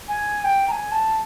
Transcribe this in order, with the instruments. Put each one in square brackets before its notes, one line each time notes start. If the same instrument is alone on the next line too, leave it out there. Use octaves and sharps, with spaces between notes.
[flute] G#5
G5
A#5
G#5
A5